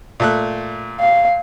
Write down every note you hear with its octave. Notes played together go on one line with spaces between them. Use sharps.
A#2 A3 F#6
F5